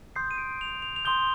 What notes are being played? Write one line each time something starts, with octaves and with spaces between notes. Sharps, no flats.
C6 D#6 G6 C7
D#7
D7
F7
F7
F7
C6 D#6 G6 G7